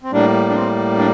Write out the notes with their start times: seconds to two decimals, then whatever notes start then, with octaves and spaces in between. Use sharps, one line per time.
0.03 C4
0.12 A2 G3 A#3 D4
0.49 D4
0.55 C4
0.98 D4